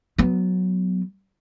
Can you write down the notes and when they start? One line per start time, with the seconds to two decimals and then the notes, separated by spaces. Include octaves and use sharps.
0.18 F#3 B3